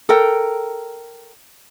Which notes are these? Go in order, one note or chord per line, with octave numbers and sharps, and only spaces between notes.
A4 A#4 G5